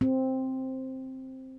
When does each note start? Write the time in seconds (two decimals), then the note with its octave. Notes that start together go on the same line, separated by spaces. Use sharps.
0.01 C4